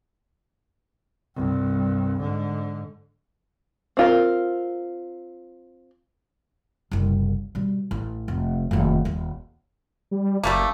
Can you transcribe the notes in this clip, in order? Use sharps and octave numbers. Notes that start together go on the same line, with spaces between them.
C2 G2
G#2 D3
C4 F4 A#4
F#1 C2
B2 G3
A1
F1
F1 D#2
D#1
G3
F#1 G3 A3 A#3